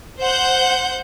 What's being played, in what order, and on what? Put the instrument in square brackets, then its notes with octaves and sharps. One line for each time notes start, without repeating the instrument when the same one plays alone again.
[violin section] C5 F#5 G6